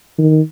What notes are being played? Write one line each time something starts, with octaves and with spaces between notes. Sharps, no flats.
D#3